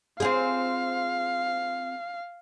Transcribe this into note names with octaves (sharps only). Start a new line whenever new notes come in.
C4 F4 G#4 F5